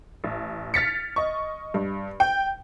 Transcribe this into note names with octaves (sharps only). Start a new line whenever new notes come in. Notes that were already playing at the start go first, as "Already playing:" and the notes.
A1
F6 A6 B6 C#7
D#5 C#6
G2
G5